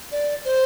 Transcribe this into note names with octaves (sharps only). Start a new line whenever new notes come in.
D5
C5